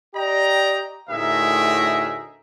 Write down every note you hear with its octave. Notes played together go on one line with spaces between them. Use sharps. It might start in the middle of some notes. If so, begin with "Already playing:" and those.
G4 D5 D#5 G5 A#5
D2 A2 D#4 G#4 A#4 E5